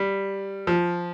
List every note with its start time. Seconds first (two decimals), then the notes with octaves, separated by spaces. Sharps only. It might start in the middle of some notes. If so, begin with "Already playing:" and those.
Already playing: G3
0.67 F3